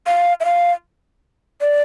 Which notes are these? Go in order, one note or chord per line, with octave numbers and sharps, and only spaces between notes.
F5
E5
F5
D5